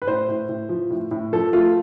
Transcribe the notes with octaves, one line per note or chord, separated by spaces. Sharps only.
B4
A2 C5
A2
A2
F3
A2
A2
F3 A4
A3 F4